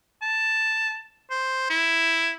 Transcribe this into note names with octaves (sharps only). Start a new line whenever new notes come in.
A5
C5
E4